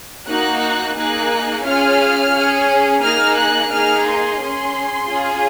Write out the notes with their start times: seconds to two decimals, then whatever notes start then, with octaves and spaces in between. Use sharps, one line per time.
0.28 A#3 D#4 F#4 F#6
0.96 A#3 D#4 G#4 F#6
1.65 C#4 F4 G#4 F6
2.33 C#4 G#4
3.02 A#3 D#4 G#4 F6
3.37 F#6
3.71 A#3 D#4 G#4 F6
4.06 C6
4.40 C#4 G#4
5.07 C#4 F4 G#4